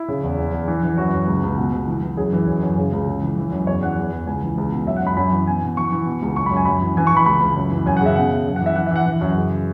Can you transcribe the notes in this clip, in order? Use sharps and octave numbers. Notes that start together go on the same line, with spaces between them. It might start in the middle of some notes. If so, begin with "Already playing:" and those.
Already playing: E4
C#3
E2
E2
E2
E3
E3
F#2 F#4
F#2
C#2
C#2
B2
C#2
E3
E3
F#2 G#4
E3
F#2
F#2
C#3
C#2
C#3
E3
E3
F#2
E2 C#5
E3 F#5
E2
E2
C#2 G#5
E3
C#2
B2
F#2 E5
F#5
F#2 B5
F#2 B5
E3
B2 G#5
B2
E3 C#6
E3
B2
C#2
F#2 C#6
B5
F#2
G#5
F#2 B5
E3
E3 G#5
C#6
E3 B5
C#2 B5
C#2
F#2
E3
F#2 G#5
F#5
C#3 E5
B2 F#5
B2
F#2
F#5
E3
E5
E3 F#5
E5
E3 F#5
E3
F#2
C#3